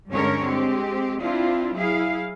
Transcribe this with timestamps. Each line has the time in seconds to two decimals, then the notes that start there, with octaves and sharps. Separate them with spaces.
0.10 G2 D3 G#3 C#4 A#4 C#5
0.45 G#3 C4 G4
1.20 C4 D4 E4 F4
1.76 F#3 E4 G#4 F5